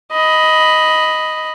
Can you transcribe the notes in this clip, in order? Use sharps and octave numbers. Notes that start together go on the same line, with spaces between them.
D#5 B5